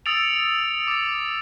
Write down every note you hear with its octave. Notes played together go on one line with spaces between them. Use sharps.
D#6 E6 A6 C#7 D7 F7
D6 A6